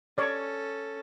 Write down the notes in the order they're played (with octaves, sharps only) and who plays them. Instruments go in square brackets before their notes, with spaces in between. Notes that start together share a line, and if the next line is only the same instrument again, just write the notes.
[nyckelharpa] C#4 A4 [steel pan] C#5 D5